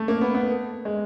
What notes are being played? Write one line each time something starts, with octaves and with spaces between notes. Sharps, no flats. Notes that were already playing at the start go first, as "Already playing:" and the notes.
Already playing: A3
A#3
B3
B3
G#3